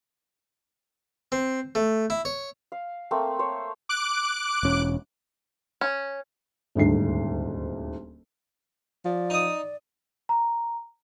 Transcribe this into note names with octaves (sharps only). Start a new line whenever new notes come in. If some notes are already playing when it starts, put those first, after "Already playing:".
C4
A3
E4
C#5
F5
A3 A#3 C4
C5 C#5
D6 F#6 D7
E1 C#4
C#4
D#1 D2 G#2 C7
F3 D5
D#4 D#6
A#5